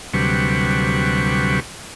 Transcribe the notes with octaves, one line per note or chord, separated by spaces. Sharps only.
D2 C3 F#3 G3 B4 C#6